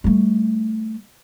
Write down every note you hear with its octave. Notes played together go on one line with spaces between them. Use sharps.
G3 A3